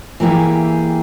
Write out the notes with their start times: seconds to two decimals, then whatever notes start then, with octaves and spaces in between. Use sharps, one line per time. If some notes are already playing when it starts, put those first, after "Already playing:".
0.20 E3 A#3 E4 G4 G#4